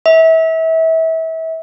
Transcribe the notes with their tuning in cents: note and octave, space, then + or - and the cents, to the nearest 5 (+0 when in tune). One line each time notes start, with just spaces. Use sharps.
E5 -30